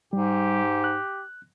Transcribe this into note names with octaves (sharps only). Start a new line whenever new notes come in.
G#2 G3 G4
F#6